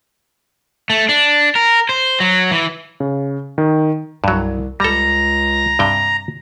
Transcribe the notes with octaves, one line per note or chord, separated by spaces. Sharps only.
A3
D4
A#4
C5
F#3
E3
C#3
D#3
C2 G2 F#3
C#2 G3 A4 A#5
G2 C3 G5